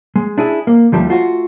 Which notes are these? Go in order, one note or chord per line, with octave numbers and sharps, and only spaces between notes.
G#3
D4 E4 G#4
A#3
D#2 F3 G3 A3
A3 F4 F#4